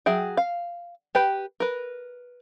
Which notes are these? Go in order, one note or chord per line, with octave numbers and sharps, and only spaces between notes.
F#3 G#4 E5 G5
F5
G4 B4 G5
A#4 B4